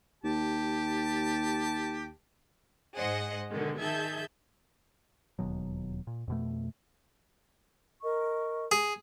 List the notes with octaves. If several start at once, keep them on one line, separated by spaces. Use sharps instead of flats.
D#2 G4 A5
G#2 G#4 C5 D#5 F#5
B2 D3 D#3 G#3
D#3 G#4 E5 A5 G6 G#6
E1 D#2 B2 F#3
A#2
F2 B2 A3
A#4 D#5 C#6
G#4